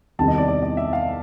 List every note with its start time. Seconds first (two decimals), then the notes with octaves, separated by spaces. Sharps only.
0.19 E2 C3 D#3 G3 A5
0.28 D#5
0.38 D5
0.48 D5
0.63 D#5
0.77 E5
0.93 F5